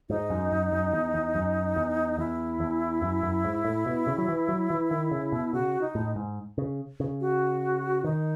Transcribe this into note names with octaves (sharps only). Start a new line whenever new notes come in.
G#2 D#4
F#2
F#2
F#2
E2
E2
F#2
E2
E2 E4
E2
F#2
F#2
G#2
A2
B2
C#3
F#3
E3
F#3
E3
D#3
C#3
B2
C#3 F#4
D#4
A2
G#2
C#3
C#3
F#4
D#3 D#4